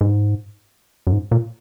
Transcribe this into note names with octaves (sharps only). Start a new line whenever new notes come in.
G#2
F#2
G#2
A#2